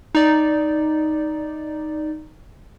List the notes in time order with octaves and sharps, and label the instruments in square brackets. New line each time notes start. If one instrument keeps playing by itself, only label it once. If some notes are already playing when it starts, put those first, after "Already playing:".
[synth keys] D#4 D5